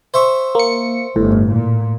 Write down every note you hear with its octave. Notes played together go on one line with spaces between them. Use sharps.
C5 E5 C#6
A#3 C#7
G1 A2
A#2